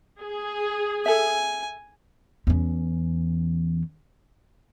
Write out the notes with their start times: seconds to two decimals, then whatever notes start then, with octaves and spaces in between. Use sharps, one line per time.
0.21 G#4
1.06 A4 E5 G#5
2.47 E2 C#4